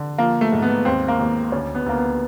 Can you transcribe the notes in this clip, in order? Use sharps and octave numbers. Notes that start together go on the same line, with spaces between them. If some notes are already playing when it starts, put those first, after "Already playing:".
Already playing: D3
F3 A#3
A3
G#2
B3
D#2 C4
A#3
D#2
D2 C#4
B3
D2 A#3
B3